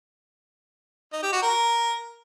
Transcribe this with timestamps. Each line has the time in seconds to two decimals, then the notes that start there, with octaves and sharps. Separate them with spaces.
1.13 D#4
1.23 G4
1.33 F#4
1.43 A#4